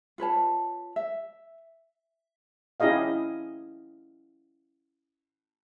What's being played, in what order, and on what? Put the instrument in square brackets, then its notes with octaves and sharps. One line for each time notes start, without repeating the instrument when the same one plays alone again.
[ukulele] F4 B4 C#5 A5
E5
[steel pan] C#4 E4 G4 G#4 D#5 F5